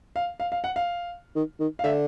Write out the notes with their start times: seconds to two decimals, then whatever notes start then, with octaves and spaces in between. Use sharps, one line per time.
0.16 F5
0.40 F5
0.52 F5
0.64 F#5
0.76 F5
1.35 D#3
1.60 D#3
1.79 F5
1.84 D3 E5